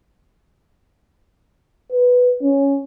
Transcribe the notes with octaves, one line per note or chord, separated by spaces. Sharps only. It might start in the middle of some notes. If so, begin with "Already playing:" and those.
B4
C#4